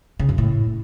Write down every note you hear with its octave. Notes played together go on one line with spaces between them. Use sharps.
C#3
F#2
A2